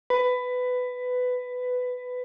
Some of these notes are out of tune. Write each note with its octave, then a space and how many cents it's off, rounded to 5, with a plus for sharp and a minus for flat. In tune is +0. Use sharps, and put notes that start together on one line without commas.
B4 +15